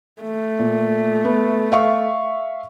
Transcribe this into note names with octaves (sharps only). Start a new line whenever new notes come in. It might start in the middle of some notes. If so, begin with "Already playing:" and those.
A3
A#2
B3
E5 F5 C#6